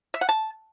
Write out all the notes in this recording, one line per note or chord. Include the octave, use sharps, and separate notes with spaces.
E5
F#5
A5